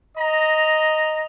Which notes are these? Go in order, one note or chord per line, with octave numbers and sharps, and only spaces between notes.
D#5 A#5